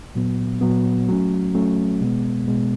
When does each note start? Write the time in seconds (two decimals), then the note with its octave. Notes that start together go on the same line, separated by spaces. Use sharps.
0.15 A#2 F#3 B3
0.61 A#2 F#3 B3
1.08 F#3 A3 C#4
1.54 F#3 A3 C#4
2.01 B2 G#3 B3
2.47 B2 G#3 B3